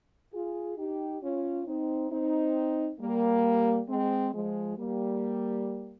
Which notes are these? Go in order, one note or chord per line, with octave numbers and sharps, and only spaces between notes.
F4 G#4
D#4 G4
C#4 F4
C4 D#4
C4 D#4
G3 A#3
G#3 C4
F3 G#3
G3 A#3